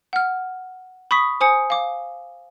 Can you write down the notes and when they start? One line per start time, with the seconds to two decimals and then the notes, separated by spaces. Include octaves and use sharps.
0.13 F#5 F6
1.11 B5 C#6 D#6 B6
1.41 C5 G#5 D#6 C#7
1.70 F5 D6